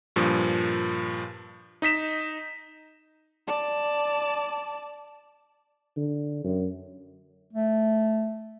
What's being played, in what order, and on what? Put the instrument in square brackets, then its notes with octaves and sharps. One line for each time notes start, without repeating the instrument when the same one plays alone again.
[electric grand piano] G2 A#2 F3
D#4 D#5 B6 E7
[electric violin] D5 A5
[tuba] D3
F#2
[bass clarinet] A3